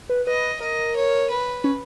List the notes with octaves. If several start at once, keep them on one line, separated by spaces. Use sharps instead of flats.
B4
B4 D#5
A#4 D#5
C#5
B4
C#4